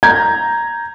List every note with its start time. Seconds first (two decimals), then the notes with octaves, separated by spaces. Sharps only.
0.03 A#5 G6 G#6